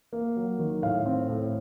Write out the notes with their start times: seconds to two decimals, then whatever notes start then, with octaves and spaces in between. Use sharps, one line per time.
0.13 A#3
0.36 F#3
0.59 D#3
0.82 A2 F5
1.06 C4
1.29 A2